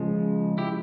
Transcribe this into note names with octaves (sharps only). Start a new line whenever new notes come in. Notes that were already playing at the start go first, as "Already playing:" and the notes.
Already playing: C#3 F3 G#3
E4 G4